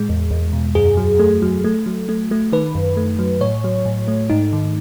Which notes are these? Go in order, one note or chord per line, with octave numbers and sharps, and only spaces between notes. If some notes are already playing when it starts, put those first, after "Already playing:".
Already playing: A2 G#3
E2
E2
B2
F#2 G#4
F#3
A3
F#3
A3
F#3
A3
A3
D#3 B4
F#2
A3
F#3
A2 C#5
F#3
A2
A3
G#2 D#4
D#3